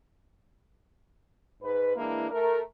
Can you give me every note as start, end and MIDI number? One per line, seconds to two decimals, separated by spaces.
1.62 1.91 44
1.62 1.91 71
1.96 2.28 52
1.96 2.28 56
1.96 2.28 58
1.96 2.28 62
1.96 2.28 64
2.30 2.60 57
2.30 2.60 70